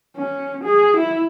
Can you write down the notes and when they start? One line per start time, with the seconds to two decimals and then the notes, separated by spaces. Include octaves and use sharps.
0.17 C#4
0.64 G#4
0.97 E4